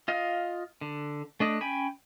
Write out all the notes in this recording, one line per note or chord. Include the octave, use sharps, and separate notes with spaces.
F4 D#5 F5
D3
A3 D4 D#5
C#4 G5 G#5 B5